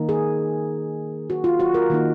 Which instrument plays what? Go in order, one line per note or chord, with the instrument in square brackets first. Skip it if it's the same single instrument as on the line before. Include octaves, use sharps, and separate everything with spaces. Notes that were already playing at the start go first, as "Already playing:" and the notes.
Already playing: [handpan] D#3 A#3 D#4
G#4
F#4
F4
F#4
A#4
D#3 A#3 D#4